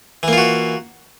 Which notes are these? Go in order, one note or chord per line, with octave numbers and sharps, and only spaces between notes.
E3 A#3 F4 F#4